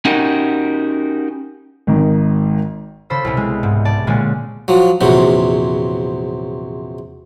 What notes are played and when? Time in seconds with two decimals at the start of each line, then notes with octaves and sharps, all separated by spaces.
0.05 C#4 D#4 F#4 G4 A#4
1.87 G#1 D#3
3.10 C#3 A4 C5 B5 E6
3.25 C2 B2
3.37 G#3
3.63 G#2
3.85 D5 A5
4.07 A#2 D3 G#3 C#4
4.68 F3 F#3
5.01 A#1 E2 C3 F#3